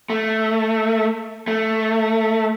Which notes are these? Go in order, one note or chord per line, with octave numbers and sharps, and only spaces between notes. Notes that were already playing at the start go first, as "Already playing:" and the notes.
A3
A3